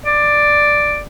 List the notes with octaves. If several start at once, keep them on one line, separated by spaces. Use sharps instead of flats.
D5